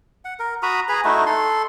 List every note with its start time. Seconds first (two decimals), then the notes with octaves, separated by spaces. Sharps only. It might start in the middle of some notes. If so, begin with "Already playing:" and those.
0.25 F#5
0.39 A#4
0.63 F#4 A#5 B5 D#6
0.89 G#4 B4 A#5 B5
1.05 A3 D#4 E4 F#4
1.26 A4 C6